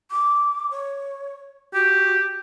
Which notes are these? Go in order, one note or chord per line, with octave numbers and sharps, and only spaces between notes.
D6
C#5
F#4 G4